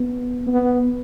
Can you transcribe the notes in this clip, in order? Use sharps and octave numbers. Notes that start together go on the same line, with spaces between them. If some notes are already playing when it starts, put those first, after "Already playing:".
Already playing: B3
B3